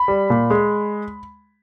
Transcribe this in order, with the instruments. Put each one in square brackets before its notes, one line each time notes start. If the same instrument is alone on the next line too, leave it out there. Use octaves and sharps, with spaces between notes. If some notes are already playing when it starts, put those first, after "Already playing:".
Already playing: [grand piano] B5
G3
A#2
G#3